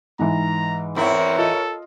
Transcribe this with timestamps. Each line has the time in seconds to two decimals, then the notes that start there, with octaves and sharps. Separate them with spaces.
0.19 G#2 E3 A#5
0.96 E2 C4 E4 A#4 C#5
1.38 F4 A4 D#5